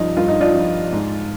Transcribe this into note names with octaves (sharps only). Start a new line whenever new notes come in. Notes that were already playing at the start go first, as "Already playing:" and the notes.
Already playing: G2 F3 D#4
G2 F4
D#4
D4 F4
F3
G#2